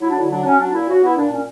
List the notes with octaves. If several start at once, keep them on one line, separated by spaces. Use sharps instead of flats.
F#3 E4
D4
D3 E4
F#3 D4
F#3 C#4
F#3 D4
A#2 E4
C#3 F#4
B3 E4
A#2 D4
A#2 C#4